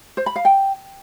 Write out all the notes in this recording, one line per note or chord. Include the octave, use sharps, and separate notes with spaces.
C5
B5
F5
G5